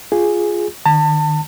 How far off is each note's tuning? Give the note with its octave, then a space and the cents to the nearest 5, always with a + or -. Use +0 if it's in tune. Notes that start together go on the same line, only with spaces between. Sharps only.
F4 +0 G#4 +0
D#3 -40 A5 +30